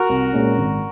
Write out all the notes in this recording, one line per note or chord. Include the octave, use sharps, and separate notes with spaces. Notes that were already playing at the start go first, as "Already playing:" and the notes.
Already playing: F#4 A#4
C2
A#2 G#3 C#4
G#1